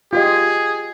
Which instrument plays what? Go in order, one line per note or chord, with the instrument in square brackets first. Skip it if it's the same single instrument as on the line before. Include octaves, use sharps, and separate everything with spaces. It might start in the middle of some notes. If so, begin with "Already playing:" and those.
[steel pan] F4 G4 D#5 [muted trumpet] G#4